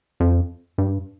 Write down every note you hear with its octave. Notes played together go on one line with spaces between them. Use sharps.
F2
G2